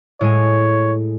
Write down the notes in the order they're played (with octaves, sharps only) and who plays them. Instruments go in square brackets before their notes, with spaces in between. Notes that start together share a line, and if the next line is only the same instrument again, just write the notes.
[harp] A2 G#3 G#5 [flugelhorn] C#5